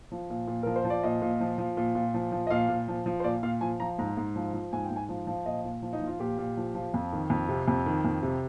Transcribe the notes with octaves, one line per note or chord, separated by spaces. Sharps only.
F3
A#2
A#2
F3 A#4
C5
F3
D5
A#2 D#5
A#2
F3
F3
A#2
A#2
F3
F3
D#5
A#2 F5
A#2
F3
F3
C5
A#2 D5
A#2 F5
F3 G#5
F3 A#5
G#2 A#5
G#2
F3
F3
G#2 G#5
G5
G#2
G#5
F3
F3
A#2 D#5
A#2
F3
D#4
F3
F4
A#2 G4
A#2
F3
F3
F2
D#3
F2
C3
F2
D#3
F2
C3